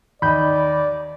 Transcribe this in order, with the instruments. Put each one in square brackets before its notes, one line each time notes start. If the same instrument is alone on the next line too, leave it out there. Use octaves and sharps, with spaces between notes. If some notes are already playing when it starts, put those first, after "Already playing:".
[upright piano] D#2 D#5 [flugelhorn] D5 [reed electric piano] B5 G6